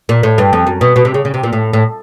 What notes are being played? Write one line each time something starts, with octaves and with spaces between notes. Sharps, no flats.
A#2
A2
G2
F2
F#2
B2
B2
C3
C#3
C#3
C3
A#2
A2
A2